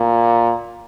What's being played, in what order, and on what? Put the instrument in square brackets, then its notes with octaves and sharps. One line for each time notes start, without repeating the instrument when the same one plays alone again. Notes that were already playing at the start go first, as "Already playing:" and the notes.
Already playing: [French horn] A#2